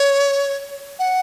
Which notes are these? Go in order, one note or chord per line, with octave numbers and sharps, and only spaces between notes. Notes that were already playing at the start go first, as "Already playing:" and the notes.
Already playing: C#5
F#5